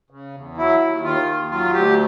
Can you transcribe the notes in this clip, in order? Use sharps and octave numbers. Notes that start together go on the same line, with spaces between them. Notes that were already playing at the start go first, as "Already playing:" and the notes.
C#3
E2
F#3 E4
D#2
D#3 F4
D#2
F#3 F4
D2 G4